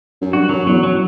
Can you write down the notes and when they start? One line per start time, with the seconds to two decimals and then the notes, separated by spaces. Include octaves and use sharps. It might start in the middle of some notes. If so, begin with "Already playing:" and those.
0.21 F#2
0.33 G2 F#4
0.49 F#2 F#3
0.66 E2 F#3
0.83 F#3